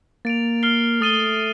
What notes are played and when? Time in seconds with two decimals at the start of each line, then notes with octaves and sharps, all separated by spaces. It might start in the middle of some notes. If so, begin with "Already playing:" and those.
0.25 A#3 A6 D7 F7
0.63 F6 C7 G7
1.01 A3 D#6 A6 D#7 G7